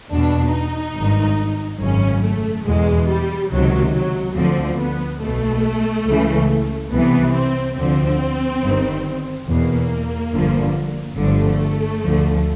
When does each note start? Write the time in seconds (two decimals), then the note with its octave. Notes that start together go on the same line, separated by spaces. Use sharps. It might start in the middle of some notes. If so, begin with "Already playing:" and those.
0.10 E2 B2 D4
0.53 D#4
0.95 G#1 G2 D#3
1.80 G#1 F#2 C#3 C#4
2.23 A3
2.65 E2 B2 G#3
3.09 G3
3.51 C#2 C3 D#3 F#3
3.94 F#3
4.36 D2 D3 F3 C4
4.79 B3
5.21 B1 B2 A3
6.07 C#2 C#3 E3
6.92 C2 C3 E3 B3
7.34 C4
7.77 D2 D3 F3 C4
8.62 G1 G2 D#3
9.47 E2 B2 A#3
10.33 G1 G2 D3 F3
11.18 G1 G2 D3 F3 A3
12.03 D2 D3 F3